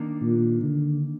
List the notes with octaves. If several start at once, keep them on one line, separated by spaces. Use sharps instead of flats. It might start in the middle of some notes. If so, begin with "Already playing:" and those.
Already playing: D#3 A#3 D4
A#2
D3